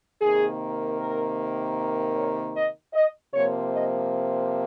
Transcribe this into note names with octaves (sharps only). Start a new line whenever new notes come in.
C3 D#3 A#3 G#4
A#4
C#5
D#5
D#5
C3 F3 A#3 C#5
D#5